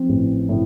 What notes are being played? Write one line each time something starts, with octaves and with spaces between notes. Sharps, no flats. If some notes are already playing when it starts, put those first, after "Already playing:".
Already playing: F3 C4
A1
A2